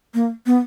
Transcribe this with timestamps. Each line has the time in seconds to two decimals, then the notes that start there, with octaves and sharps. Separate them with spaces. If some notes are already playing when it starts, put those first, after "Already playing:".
0.14 A#3
0.46 B3